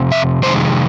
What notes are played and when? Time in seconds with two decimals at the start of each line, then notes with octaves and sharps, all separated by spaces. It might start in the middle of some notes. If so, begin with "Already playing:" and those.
Already playing: F2 C3
0.12 E5
0.42 F2 C3 D#3 G#3 C5